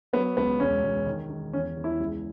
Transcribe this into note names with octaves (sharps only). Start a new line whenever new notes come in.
F#3 B3
C#2 B3
E1 C#4
E1
D#3
D#3
E2 C#4
E2
E4
C#2